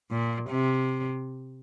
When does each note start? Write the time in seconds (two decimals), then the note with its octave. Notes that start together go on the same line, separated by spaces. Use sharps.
0.10 A#2
0.50 C3